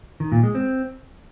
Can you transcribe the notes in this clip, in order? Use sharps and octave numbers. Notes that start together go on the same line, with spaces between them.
D#3
A#2
G#3
C4